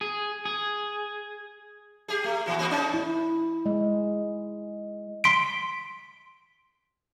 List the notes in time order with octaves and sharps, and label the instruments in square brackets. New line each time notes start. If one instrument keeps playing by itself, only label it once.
[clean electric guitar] G#4
G#4
[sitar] G4 G#4
A3
A#2 E3 F#4
A#3 C4 F#4
A3 C#4 D#4
[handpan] E4
G#3
[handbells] C6 B6 D7